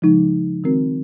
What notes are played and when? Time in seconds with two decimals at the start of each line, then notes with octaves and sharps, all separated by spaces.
0.02 C#3 F3 G#3 D#4
0.64 D#3 G#3 C4 F#4 A#4